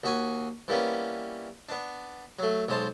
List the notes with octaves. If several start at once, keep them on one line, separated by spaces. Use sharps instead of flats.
D#2 F#4 G#5
E3 G3 A#3 B3 C#4
B3 D4
F#3 A3
B1 G#3 C5 A5